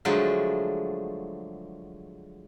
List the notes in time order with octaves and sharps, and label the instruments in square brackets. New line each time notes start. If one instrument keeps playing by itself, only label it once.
[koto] D3 F3 F#3 G#3 A3